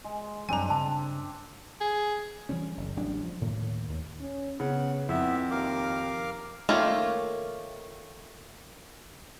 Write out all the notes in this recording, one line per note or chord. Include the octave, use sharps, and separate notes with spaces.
G#3
F#2 F#3 G3 C4 D4 G#5 A#5
G2 C#3 A5
G#4
E3 F3 G3 C#4
F#1
A1 F#3 G3 D4
F3
D2 A2 D#3 A#3
D#2
C#4
C#3 B3 F#5
F2 B3 E4 E5
D#2 A#4 F5 D6
D#3 A3 A#3 C#4 F4